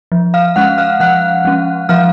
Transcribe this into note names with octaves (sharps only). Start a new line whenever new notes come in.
F3
F5 F6
G#3 C#4 F#5 F#6
F5 F6
F3 F#5 F#6
G#3 C#4
F3 F5 F6